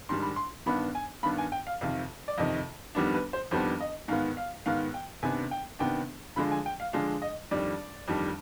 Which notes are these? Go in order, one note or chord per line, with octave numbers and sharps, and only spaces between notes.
G#2 D#3 G3 D4 C6
B5
C6
G2 D#3 B3 D4 B5
G#5
G2 D#3 B3 D4 B5
G#5
G5
F5
F2 C3 D#3 F5
D5
F2 C3 D#3 D#5
F2 D#3 G3 B3 D4
B4
C5
F2 D#3 G3 B3 D4 C5
D#5
G#2 D#3 B3 F5
F5
G#2 D#3 B3 F5
G5
C3 D#3 B3 D4 G#5
G5
C3 D#3 B3 D4 G5
D3 F3 G#3 D4 B5
G#5
G5
F5
D3 F3 G#3 D4 F5
D#5
F2 D#3 G3 D4 D5
F2 D#3 G3 D4